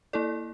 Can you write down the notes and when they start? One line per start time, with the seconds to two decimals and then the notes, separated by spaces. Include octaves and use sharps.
0.13 A#3 E4 A4 D5